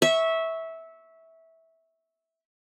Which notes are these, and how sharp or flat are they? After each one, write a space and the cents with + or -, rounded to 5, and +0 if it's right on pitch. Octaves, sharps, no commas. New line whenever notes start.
E5 -15 C#6 +0